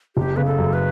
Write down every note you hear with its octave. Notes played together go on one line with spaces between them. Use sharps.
F#1 G4
C#3 B4
A4
F#2
B4